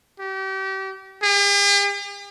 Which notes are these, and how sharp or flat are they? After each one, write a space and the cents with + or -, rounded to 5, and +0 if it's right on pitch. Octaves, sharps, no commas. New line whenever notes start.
G4 -35
G4 +45